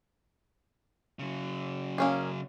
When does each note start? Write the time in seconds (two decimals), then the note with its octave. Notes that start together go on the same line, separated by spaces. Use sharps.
1.19 C#3 F#3
1.98 A#3 C#4 G#4